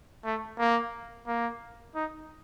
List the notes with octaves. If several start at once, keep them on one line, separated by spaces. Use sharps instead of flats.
A3
A#3
A#3
D#4